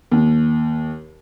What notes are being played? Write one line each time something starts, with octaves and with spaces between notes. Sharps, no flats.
D#2